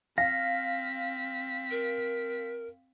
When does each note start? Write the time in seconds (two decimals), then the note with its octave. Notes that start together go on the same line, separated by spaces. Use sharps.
0.18 C4 F5 A#6 B6
1.71 A#4